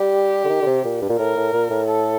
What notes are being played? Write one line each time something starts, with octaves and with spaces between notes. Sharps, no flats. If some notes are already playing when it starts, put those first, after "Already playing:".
Already playing: G3 G4
D3
D#3
D3
C3
A#2
G2
A#2
A2 A#4
A2
A#2
A2
A4